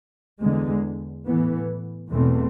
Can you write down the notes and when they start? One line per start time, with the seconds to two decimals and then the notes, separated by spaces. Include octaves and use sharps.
0.41 E2 D3 G#3
1.26 A2 E3 B3
2.10 E2 B2 A3 C4